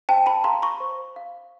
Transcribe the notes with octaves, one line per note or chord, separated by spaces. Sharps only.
C5 G5 A5
A5 B5
F5 A#5 C6
B5 C#6
C5
F5